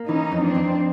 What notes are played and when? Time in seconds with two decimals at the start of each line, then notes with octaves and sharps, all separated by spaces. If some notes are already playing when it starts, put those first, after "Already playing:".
Already playing: A#3
0.08 E3 C#4 D#4
0.32 F2
0.43 C4 D4
0.55 F2